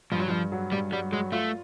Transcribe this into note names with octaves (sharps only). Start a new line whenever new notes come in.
G2 F3
F#3
G2 F3
F#3
G2 G3
F#3 G3
F#3 G#3
A3 F4